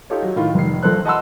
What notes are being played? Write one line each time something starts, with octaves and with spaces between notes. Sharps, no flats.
D#4 F4 G4 A4 C#5
F#3
A2 D#3 F4
F1 D#3 C7
A#1 A#3 A4 C5 F#6
D#5 F#5 A5 B5 C6 E6